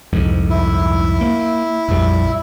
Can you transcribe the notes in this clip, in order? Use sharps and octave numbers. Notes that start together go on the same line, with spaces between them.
C2 F2 G#2
E4
A#3
A#1 F2 G3